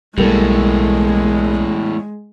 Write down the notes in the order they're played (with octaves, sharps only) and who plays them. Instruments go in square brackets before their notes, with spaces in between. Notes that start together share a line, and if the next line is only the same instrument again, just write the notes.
[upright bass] B1 [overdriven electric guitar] E2 A2 [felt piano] G3 A#3 A4 [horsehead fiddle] G#3